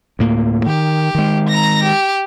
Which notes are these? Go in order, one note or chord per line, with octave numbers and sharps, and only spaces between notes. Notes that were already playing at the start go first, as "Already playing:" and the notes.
D2 A2 A#3
D#3 G4
D#3 G#3
A#5 A#6
G4